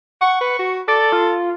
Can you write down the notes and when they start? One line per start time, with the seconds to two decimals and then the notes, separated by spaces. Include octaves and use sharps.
0.21 F#5 C#6
0.41 B4
0.59 F#4
0.88 A4 D5
1.12 F4